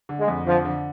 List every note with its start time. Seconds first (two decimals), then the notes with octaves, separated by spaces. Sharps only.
0.09 D3
0.19 G#3
0.28 F2
0.46 D3 F3
0.65 D3